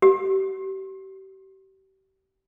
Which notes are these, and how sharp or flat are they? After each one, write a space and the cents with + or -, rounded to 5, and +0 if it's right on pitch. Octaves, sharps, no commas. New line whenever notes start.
G4 -35